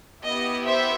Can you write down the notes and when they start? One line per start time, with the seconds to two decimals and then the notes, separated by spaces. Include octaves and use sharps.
0.24 B3 E4 G4 D#5
0.65 C5 E5